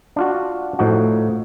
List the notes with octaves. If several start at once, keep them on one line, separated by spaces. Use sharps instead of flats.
D4 F4 F#4
A2 F3 D#4 F#4